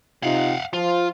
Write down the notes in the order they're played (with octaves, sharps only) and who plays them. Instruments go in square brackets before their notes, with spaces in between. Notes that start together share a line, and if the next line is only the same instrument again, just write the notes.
[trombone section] C3 D#4 F4 [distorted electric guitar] F5 F#5
[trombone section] F3 [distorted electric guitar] F4